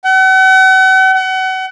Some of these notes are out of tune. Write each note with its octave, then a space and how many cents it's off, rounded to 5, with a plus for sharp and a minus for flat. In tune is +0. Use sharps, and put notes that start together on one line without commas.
F#5 +40
F#5 +30